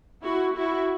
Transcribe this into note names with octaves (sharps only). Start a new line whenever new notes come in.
E4 F#4
E4 F#4